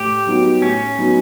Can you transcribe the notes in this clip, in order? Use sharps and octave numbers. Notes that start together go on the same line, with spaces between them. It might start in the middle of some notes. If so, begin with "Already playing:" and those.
Already playing: A2 G4
F#3 B3 D#4 F#4
A2 C#4
F#3 B3 D#4 F#4